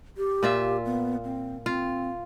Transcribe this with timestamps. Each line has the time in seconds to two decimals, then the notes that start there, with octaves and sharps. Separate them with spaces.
0.17 G4
0.43 A#2 F4 E5
0.85 B3
1.24 C4
1.66 C4 F4